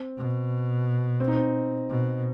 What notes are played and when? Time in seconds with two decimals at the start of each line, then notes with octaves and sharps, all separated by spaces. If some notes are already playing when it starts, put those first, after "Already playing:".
Already playing: C4
0.17 B2
1.20 C4
1.28 D#4
1.36 C4
1.89 B2